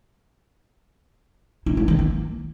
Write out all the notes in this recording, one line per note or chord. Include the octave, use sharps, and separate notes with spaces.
E4
G#3
D#3
A#3